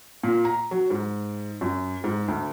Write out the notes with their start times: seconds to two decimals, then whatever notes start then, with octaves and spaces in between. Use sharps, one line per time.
0.23 A#2
0.45 A#5
0.71 F#3
0.90 G#2
1.61 F#2
2.04 G#2
2.28 D2